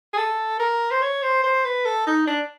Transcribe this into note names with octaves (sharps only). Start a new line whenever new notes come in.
G#4
A4
A#4
C5
C#5
C5
C5
B4
A4
D#4
D4